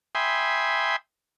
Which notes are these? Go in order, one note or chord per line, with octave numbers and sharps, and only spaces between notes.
E5 G5 G#5 B5 C6 D#6